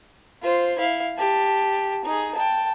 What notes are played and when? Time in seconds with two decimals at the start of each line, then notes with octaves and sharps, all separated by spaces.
0.43 F4 C5
0.78 E4 F5
1.18 G4 A5
2.05 D#4 G#4
2.35 G5 A5